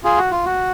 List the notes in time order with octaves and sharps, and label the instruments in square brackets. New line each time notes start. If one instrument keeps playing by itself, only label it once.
[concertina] F4 G#4
F#4
F4
F#4